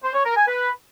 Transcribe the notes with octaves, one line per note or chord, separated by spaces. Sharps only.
C5
C#5
A#4
G#5
B4